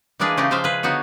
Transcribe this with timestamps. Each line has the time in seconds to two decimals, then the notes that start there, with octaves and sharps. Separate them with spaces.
0.20 E3 G#3 A#3 D4 G#4 B4
0.37 C#3 A3 D#4 G4 D#5
0.51 C#3 F3 G#3 C5 E5 F5
0.64 G#4 B4
0.83 D3 B3 D#4 F#4 C#5